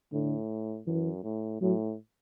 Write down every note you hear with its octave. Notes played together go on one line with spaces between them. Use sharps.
A2 D3
F#2 E3
A2
A2 F#3